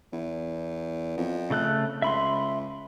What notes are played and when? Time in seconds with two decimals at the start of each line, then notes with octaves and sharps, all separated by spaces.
0.13 E2
1.18 F2
1.50 C#3 A3 F#6
2.02 C#2 E5 B5 C6